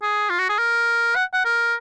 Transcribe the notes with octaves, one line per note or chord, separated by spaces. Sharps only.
G#4
F4
F#4
G#4
A#4
F#5
F#5
A#4